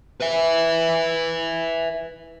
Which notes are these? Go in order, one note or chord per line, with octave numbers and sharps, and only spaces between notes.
B4 E5